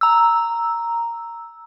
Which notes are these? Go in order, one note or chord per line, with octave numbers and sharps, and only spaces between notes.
A#5 E6